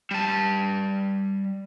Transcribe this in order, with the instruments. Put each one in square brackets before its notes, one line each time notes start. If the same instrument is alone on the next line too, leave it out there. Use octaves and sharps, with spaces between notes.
[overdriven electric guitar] G3 A5